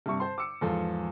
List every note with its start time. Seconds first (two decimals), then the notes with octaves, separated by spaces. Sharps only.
0.06 G2 C3 E5 C#6
0.20 C5 A5 C6
0.38 D6 E6 C#7
0.61 E2 G#2 F3 A4